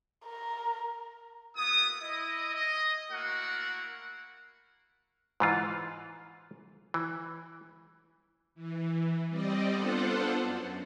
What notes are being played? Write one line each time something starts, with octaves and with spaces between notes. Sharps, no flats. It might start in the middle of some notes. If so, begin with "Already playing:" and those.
A#4
A#3 B3 E4 F#4 D#6
E4 D#5
D#5
A3 A#3 E4 F#4 A#4 F#5
G#2 E3 F4
E3
E3
G3 C4 D5 D#5
B3 D4 F4 A4 C5 F#5
F#2